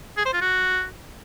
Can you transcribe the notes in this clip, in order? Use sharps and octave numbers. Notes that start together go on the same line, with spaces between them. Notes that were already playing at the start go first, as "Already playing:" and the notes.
G#4
C5
F4
F#4